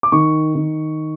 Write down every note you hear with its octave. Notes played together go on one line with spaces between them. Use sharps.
D6
D#3 C#6
D#3